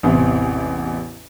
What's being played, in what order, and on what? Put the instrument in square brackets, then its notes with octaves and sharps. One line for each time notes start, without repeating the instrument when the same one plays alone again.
[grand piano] A1 E2 C3